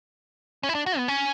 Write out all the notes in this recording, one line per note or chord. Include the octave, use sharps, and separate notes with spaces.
C#4
E4
D4
F#4
B3
C#4